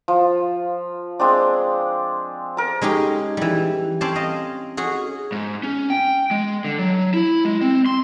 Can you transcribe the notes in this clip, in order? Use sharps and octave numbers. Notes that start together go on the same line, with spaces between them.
F3
G#3 C4 D4
A#4 A5
G#3 C#4 D#4 G4
E3 G3
C4 C#4 C5 D5 A5
D#5 F5
C#4 F#4 G#4
G#2
C#4
G5
G#3
D3
F#3
E4
G#3
C4
C6